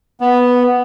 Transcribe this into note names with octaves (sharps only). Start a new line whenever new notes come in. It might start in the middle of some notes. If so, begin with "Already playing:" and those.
B3